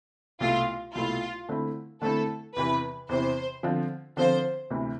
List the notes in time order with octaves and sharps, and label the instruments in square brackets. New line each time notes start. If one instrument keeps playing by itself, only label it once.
[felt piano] C2 B2 A3 E4 [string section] F4
[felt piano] C2 B2 A3 E4 [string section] F4
[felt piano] D3 A3 C4 E4
[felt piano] D3 A3 C4 E4 [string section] A4
[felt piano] E2 C3 E3 [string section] B4
[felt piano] E2 C3 E3 [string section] C5
[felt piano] D3 F3 C4 F4
[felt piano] D3 F3 C4 F4 [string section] C5
[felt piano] D2 C3 E3